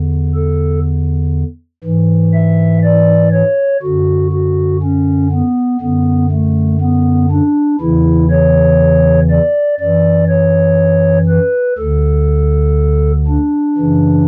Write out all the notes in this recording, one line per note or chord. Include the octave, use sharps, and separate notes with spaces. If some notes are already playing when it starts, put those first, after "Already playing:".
Already playing: E2 D3
A4
G#2 E3
E5
D5
C#5
F#2 D3 F#4
F#4
C#4
B3
F#2 D3 B3
A3
B3
D4
E2 C#3 E3 E4
C#5
D5
F#2 E3 D5
C#5
B4
D2 D3 A4
D4
F#2 C#3 E3